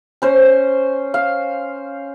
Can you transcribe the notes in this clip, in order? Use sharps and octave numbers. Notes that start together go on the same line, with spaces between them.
C#4 C5
F5